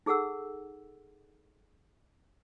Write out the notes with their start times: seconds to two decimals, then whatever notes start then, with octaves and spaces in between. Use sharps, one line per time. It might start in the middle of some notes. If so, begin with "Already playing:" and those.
0.06 D#4 G#4 A4 F#5 E6